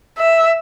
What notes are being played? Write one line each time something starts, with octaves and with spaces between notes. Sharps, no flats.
E5